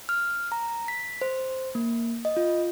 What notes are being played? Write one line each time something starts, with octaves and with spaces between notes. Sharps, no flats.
F6
A#5
B6
C5
A#3
D#5
F4